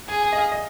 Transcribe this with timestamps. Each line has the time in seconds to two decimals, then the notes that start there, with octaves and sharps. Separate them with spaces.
0.09 G#4 G#5
0.23 G#5
0.32 D#5
0.38 F5
0.52 D#5